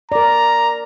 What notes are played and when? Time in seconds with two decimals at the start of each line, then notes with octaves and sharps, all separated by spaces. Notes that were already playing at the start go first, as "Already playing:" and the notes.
0.12 A#4 D5 A#5